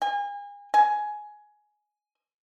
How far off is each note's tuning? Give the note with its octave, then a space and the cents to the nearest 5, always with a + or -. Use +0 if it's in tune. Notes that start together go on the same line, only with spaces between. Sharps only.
G#5 -35
G#5 +15